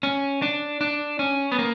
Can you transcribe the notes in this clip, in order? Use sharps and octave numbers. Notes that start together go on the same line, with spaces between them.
C#4
D4
D4
C#4
B3
A#3